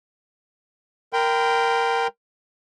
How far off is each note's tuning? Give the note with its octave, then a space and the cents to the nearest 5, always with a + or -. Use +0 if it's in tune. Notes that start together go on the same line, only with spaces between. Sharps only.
A#4 +0 G5 +0 C6 -45